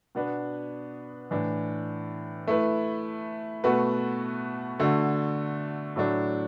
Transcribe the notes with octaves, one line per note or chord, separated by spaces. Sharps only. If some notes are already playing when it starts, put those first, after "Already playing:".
B2 B3 D4 B4
A2 E3 D4
A3 E4 B4
B2 A3 F#4 B4
D3 A3 F#4
A2 F#3 A3 D4